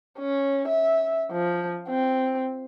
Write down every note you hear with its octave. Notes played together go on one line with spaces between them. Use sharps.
C#4
E5
F3
C4